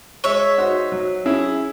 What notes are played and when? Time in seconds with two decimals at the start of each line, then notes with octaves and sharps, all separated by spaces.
0.24 G#3 C#5 E5
0.58 D#4 F#4 C5
0.92 F#3
1.25 C#4 E4 G#4